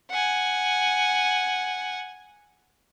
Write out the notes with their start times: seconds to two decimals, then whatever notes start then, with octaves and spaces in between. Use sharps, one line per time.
0.11 F#5 G#5